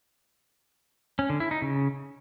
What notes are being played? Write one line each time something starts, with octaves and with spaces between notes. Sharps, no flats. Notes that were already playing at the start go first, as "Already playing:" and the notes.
C#4
D3
E4
D#4
C#3